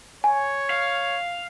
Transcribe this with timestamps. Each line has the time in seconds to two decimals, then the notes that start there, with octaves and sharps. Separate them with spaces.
0.24 C#5 G#5
0.70 F5